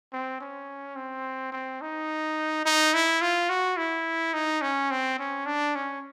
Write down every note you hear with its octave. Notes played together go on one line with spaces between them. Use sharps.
C4
C#4
C4
C4
D#4
D#4
E4
F4
F#4
E4
D#4
C#4
C4
C#4
D4
C#4